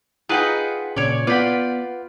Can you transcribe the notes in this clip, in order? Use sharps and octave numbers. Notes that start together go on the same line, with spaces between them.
D#4 F4 G#4 B4 F#5 G5
A#2 C#3 C#5 D5
B3 F4 B4 D5 F#5 G5 B5